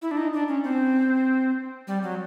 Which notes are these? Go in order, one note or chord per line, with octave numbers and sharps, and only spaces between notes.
E4
D4
D#4
D4
C#4
C4
G3
F#3